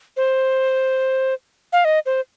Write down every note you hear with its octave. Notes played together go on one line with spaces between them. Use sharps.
C5
F5
D#5
C5